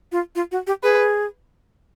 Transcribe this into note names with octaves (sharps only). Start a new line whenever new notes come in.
F4
F4
F#4
G4
G#4 B4